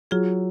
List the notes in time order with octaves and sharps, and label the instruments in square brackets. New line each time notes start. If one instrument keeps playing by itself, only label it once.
[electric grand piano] F#3 [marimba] F4 G#4